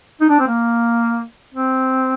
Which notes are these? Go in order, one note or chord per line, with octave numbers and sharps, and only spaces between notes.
D#4
D4
C4
A#3
C4